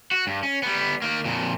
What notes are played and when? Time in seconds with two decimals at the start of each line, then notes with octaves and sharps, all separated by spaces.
0.11 F#4
0.27 G2
0.43 C#4
0.63 G3 B3
1.02 D#3 A#3
1.25 F2 A#2